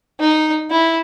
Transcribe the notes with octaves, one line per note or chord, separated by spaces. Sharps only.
D#4
E4